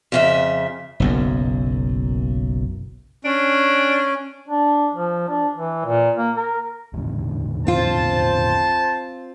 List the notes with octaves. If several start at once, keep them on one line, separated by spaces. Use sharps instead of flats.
F2 C#3 E5
F#1 B1 F#2
C#4 D4
D4
F3
D4
E3
A#2
A#3
A#4
E1 A1 D3
C4 F4 C5 A5